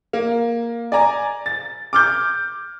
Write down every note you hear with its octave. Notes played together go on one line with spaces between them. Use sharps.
A#3
D5 G#5 A#5
A6
D6 F6 G6